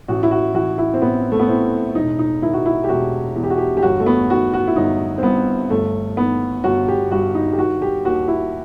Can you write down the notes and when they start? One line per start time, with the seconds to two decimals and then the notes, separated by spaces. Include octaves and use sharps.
0.08 A1 F#4
0.23 E4
0.31 F#4
0.54 E3 F#4
0.78 E4
0.94 C4
1.02 A1 B3
1.32 A3
1.39 B3
1.48 A2 C4
1.95 E1 D#4
2.19 D#4
2.42 D#3 E4
2.53 F#4
2.66 E4
2.84 G4
2.89 E1 F#4
3.36 E2
3.43 G4
3.50 F#4
3.58 G4
3.77 G4
3.83 G1 F#4
4.00 A3
4.06 B3
4.29 D#3 F#4
4.54 F#4
4.67 E4
4.76 G1 D#4
5.18 C4
5.23 G2 B3
5.70 G1 A3
6.17 D#3 B3
6.64 G1 F#4
6.88 G4
7.11 G2 F#4
7.35 D#4
7.53 G4
7.58 D#3 F#4
7.82 G4
8.04 D#2 F#4
8.28 E4